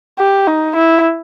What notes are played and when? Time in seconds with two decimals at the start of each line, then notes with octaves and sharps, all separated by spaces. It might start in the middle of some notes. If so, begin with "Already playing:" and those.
0.19 G4
0.47 D#4
0.76 E4